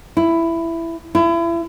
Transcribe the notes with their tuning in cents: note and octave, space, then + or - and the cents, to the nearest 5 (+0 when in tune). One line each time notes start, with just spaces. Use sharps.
E4 +10
E4 +35